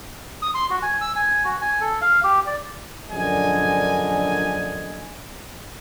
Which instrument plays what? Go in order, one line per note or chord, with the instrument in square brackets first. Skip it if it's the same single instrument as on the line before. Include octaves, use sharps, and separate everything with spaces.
[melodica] D#6
C6
F#4
G#5
E6
G#5
F#4
G#5
A4
F5
G4
D5
[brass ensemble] A#1 F#2 D3 A#3 D#5 G#5